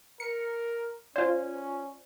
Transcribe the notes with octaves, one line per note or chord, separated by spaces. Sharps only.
A#4 C#7
C#4 F4 C5 D5